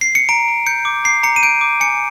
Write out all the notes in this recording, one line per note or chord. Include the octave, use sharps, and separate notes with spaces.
C7
C#7
A#5 D7
A#5
G6 C#7
D6
A#5 C7
A#5 C#7
D#7
G6 D7
D6
G#5 C#7